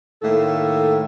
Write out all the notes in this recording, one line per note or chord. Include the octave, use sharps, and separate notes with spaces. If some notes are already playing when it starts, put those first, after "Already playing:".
A2 D#3 A3 A#3 A4 E5